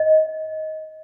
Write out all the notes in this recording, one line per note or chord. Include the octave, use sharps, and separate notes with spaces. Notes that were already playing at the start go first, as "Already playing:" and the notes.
Already playing: D#5